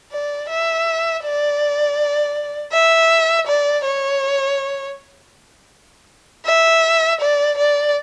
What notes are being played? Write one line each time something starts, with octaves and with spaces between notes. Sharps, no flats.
D5
E5
D5
E5
D5
C#5
E5
D5
D5